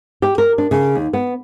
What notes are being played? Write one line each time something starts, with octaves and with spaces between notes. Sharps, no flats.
G4
A#4
D4
C#3
D#2
B3